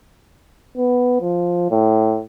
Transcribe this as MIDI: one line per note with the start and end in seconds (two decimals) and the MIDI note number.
0.77 1.19 59
1.21 1.69 53
1.71 2.21 45